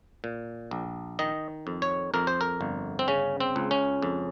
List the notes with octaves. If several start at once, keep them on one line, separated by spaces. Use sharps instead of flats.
A#2
A#1
D#3 D#5
F2
C#5
F2 A#4
C5
A#4
G1
C4
C#3 C#4
C4
C#2
C#4
F2